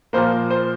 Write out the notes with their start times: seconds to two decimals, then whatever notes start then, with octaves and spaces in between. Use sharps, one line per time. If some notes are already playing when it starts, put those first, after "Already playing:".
0.13 A#2 F3 A#3 C5
0.50 C5